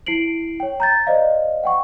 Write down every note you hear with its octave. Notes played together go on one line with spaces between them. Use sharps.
E4 C7 D7 F#7
C#5 G5
A#5 G6 A6
C5 D5 D#5 F5
F#5 G5 C#6